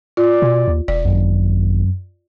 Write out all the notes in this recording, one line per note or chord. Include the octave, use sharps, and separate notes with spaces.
F4 D5
B2
D#2
E1 D5
G#1 F#2